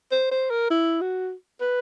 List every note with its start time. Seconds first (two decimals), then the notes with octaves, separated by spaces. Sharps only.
0.11 C5
0.31 C5
0.50 A#4
0.70 E4
1.01 F#4
1.61 B4